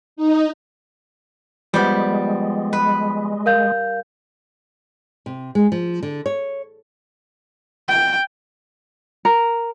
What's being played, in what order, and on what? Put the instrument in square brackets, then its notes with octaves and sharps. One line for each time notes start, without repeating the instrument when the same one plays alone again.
[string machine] D#4
[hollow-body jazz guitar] F3 B3 [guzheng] G3 G4 [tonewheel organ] G#3
[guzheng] B4
[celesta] A#4 F5 G6
[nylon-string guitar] C3
G#3
F3
D3
C#5
[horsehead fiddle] G5
[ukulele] A#4